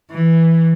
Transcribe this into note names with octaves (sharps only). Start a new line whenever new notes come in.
E3